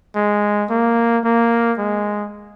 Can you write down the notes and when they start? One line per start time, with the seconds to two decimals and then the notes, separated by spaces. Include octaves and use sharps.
0.16 G#3
0.70 A#3
1.24 A#3
1.78 G#3